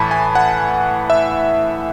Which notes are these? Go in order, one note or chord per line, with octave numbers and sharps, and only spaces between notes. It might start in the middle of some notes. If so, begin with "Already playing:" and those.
Already playing: A2 E3 A5 B5
G#5
F#5
E5